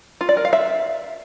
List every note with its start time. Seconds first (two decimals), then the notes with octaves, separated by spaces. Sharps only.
0.21 F4
0.29 D5
0.37 A#4
0.45 F5
0.53 E5